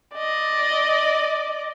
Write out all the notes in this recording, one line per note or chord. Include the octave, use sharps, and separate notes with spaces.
D5 D#5